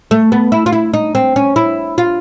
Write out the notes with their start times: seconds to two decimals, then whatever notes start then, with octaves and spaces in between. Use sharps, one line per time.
0.11 A3
0.32 B3
0.52 E4
0.66 F4
0.72 E4
0.94 D#4
1.15 C4
1.36 C#4
1.56 E4
1.98 F4